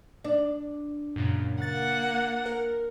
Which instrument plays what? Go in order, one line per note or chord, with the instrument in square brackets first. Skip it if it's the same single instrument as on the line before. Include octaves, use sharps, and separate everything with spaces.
[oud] D4
[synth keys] F#2 A#2 C#3
[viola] A#3 F#5 [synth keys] A6
[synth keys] A#4